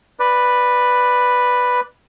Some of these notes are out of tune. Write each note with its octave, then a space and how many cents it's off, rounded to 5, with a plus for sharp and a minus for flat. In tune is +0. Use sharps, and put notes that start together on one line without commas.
B4 +0 D5 +10